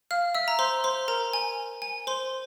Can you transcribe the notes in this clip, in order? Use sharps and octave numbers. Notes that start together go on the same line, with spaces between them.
F5 F6
E5 E6
A#5
C5 C6
C5 C6
A#4 A#5
G#5
G#5
C5 C6